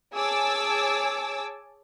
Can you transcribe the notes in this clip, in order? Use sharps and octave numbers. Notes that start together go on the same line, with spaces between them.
G#4 C#5 G#5 A5 D6 E6